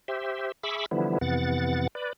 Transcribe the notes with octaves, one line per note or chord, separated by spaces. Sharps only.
G4 C5 E5
G#4 E5 B5 C#6 D6 E6
D3 E3 F3 G3 B3 E4
F2 C3 E3 B3 F#5 A6
B4 D5